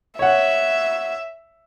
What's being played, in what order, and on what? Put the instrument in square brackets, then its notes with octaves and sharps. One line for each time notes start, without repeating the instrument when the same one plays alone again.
[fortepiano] C#5 F#5 [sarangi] E5